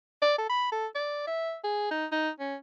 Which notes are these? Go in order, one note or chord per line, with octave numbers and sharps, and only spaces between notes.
D5
A4
B5
A4
D5
E5
G#4
D#4
D#4
C#4